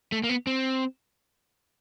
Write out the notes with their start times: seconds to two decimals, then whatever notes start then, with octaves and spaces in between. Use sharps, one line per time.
0.12 A3
0.24 A#3
0.29 B3
0.47 C4